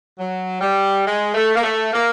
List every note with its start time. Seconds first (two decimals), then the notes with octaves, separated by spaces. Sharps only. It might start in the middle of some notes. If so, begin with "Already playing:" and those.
0.18 F#3
0.61 G3
1.06 G#3
1.35 A3
1.56 A#3
1.63 A3
1.93 A#3